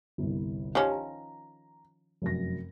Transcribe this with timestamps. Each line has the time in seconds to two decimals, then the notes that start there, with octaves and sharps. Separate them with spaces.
0.18 G1 C2
0.75 D#3 F3 C#4 G4 C#5
0.91 A#5
2.22 F1 F#2 A#6